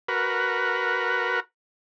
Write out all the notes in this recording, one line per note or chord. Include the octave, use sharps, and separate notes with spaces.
F#4 A#4 B4